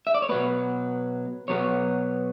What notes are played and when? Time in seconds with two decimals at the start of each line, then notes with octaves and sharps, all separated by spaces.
0.07 E5
0.15 D5
0.22 C#5
0.29 B2 F#3 B3 B4
1.48 B2 F#3 B3 C#5